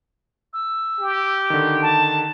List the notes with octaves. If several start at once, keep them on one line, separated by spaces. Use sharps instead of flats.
E6
G4
D3 D#3
A5